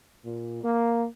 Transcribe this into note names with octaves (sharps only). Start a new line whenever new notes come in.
A#2
A#3